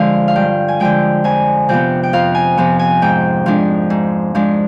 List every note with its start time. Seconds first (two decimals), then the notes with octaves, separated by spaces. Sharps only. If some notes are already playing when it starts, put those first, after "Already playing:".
Already playing: D3 F3 G#3 F4 F5
0.28 F5
0.36 G2 G5
0.68 G#5
0.80 D3 F3 G#3 G5
1.24 F2 G#5
1.69 C3 F3 B3 G5
2.03 G5
2.13 F2 F5
2.35 G#5
2.57 C3 F3 B3
2.79 G#5
3.02 G#2 G5
3.46 F3 G#3 D4
3.90 G#2
4.35 F3 G#3 D4